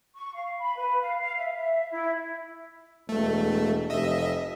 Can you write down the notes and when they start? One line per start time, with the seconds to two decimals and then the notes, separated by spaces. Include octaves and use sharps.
0.15 C#6
0.34 F5
0.59 B5
0.76 B4
1.00 F5
1.20 F5
1.36 E5
1.57 E5
1.91 E4
3.09 E1 A3
3.90 F1 D#5 E5